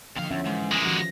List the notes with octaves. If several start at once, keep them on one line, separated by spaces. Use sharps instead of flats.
D#2 D3 F3 F5
E2 E3 C#4 E5
G#2
G3 G#3 A#3 F4 G#5
D#3 F3 C#4 F#4